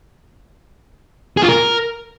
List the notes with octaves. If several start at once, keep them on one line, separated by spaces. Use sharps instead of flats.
G#4
F4
A#4